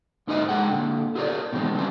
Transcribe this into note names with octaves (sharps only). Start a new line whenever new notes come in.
G#2 D3 D#4 C5 D#5 E5
G#3 G#4 F#5 G5
A#2 D3
E4 F4 G#4 A#4 C#5 D5
B2 D#3 E3 G#3 C4
D3 F#3 G3 B3 C#4 D4